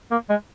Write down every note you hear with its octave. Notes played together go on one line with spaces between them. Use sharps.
A#3
G#3